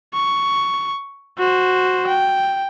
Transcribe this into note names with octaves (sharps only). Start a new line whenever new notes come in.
C#6
F#4 C5
G5